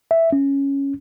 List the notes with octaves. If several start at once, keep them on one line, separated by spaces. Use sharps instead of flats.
E5
C#4